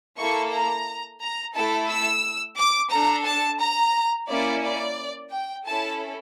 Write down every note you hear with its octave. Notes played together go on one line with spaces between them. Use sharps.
A#3 E4 A4 C#6
A#5
A#5
A3 E4 A4 A5
E6
D6
D4 A4 A#5
A5
A#5
A#3 C#4 E4 D5
D5
G5
C#4 E4 A4 A5